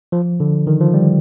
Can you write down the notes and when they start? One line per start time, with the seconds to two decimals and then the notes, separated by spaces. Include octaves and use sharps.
0.12 F3
0.40 D3
0.67 D#3
0.81 F3
0.94 G3